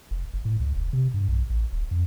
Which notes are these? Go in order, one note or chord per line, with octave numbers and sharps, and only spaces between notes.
F1
F#1
A2
C#2
E1
C3
G2
B1
A1
D#1
F2